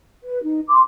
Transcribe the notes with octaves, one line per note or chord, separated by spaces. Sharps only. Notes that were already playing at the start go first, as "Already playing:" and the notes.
B4
D#4
C6 D6